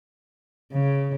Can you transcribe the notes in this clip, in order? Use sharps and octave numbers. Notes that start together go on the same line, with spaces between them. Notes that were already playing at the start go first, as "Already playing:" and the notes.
C#3